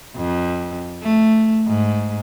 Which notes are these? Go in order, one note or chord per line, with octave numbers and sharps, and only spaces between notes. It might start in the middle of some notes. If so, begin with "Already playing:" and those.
F2
A3
G#2